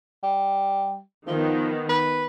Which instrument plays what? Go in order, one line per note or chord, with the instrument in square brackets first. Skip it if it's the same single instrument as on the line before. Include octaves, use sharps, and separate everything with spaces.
[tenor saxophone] G3
[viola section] D#3 B3 [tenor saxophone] F3
[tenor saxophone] B4